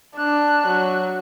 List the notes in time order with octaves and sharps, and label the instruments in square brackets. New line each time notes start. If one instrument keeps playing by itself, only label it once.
[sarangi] D4 [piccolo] F#6
[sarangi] F#3